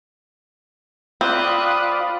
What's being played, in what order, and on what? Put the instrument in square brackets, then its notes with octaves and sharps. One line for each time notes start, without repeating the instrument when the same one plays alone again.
[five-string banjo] C4 [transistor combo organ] F4 D5 B5 [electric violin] D#6 F#6